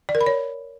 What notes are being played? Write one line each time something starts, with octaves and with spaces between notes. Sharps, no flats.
D5
A#4
B5
C#5